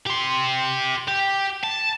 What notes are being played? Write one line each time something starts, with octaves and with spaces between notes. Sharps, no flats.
G4 C6
G4
A5